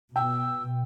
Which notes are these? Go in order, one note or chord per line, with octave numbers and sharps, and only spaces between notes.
B2 G5 E6